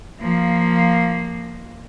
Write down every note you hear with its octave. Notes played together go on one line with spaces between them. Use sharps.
F3 A#3